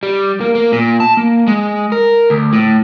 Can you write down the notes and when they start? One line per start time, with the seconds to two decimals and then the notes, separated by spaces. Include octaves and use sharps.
0.03 G3
0.41 A#3
0.55 A#3
0.72 A#2
1.00 A5
1.17 A#3
1.47 G#3
1.92 A#4
2.30 D2
2.53 A2